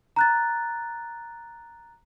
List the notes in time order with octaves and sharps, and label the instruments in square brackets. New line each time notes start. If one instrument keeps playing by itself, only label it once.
[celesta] A#5 F#6 A6